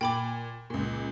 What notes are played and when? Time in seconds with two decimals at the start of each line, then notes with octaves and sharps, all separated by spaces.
0.01 A#2 G5 B5 D6
0.70 C#2 A#2